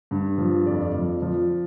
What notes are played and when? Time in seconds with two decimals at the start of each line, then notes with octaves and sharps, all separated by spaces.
0.11 G2
0.38 F3
0.66 F2 D5
0.94 F3
1.22 F3